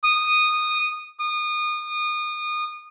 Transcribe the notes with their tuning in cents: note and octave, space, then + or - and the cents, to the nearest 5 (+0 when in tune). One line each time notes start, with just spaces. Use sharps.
D#6 -10
D#6 -30